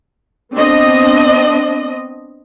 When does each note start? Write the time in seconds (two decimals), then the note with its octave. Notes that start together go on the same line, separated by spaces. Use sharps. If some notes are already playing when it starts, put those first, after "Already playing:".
0.53 B3 C4 D4 D#5